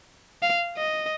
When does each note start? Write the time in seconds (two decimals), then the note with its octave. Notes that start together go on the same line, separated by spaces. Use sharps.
0.42 F5
0.77 D#5